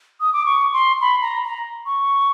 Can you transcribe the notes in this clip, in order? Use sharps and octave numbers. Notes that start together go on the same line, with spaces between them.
D#6
D6
C#6
C6
B5
A#5
A#5
C#6